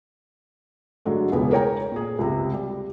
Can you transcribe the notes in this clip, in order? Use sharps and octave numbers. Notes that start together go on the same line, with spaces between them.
D3 F#3 G#3 A3
E1 C#2 B3
A#4 C#5 G5 A#5
A#2 G#4
C#2 C3
G3